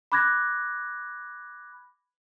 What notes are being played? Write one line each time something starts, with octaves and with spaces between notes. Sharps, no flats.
B5 D6 F#6 G#6 A#6